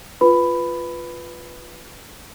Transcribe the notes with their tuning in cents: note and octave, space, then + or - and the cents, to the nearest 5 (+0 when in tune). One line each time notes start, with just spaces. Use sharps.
F4 +0 B4 +0 B5 +10